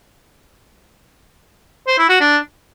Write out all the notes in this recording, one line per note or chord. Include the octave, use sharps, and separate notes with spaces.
C5
E4
F#4
D4